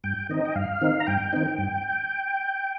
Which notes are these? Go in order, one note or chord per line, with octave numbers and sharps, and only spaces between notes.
G2 G5
D#3 C4 D#4 D#5
G5
G2 F5
D#3 C4 D#4
A#5
G2 G5
D#3 C4 D#4
G2